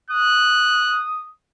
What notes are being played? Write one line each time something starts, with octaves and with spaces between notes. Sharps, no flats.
D#6 F#6